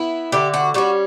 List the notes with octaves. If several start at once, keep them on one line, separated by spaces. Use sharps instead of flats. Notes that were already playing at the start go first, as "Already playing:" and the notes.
Already playing: B3 E4
D3 G4
F#4
G3 C#4 F#4